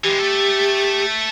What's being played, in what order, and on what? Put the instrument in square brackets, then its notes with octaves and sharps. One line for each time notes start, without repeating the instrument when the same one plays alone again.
[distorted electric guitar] E3 G#3 [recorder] G4
[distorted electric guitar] A3 A4